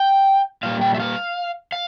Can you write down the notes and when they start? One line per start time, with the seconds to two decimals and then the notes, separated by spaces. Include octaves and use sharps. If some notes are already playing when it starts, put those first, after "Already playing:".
Already playing: G5
0.63 A#2 G3 F5
0.81 G5
0.94 E5
1.00 F5
1.72 F5